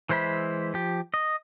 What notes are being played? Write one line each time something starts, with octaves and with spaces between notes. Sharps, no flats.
E3 G#3 C5 E5 B5
F3 G4
D#5